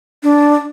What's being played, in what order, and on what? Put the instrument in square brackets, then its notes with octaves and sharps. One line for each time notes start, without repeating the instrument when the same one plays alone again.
[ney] D4